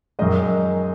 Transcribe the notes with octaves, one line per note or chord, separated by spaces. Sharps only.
F#2 D#3 G#3 D#4 D#5